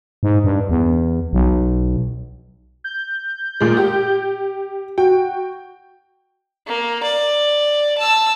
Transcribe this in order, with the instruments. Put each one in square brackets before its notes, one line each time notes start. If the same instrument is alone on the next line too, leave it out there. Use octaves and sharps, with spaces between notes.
[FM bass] G#2
G2
E2
B1
[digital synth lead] G6
[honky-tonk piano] A#2 G#3
G4
[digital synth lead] F#4 [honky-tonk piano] G5
[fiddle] A#3
D5
A5 E6